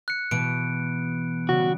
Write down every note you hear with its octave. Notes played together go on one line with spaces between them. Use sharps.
F#6 C#7
B2 E3 D7
C#3 G3 F#4